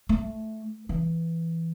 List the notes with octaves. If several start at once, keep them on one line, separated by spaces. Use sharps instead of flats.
A3
E3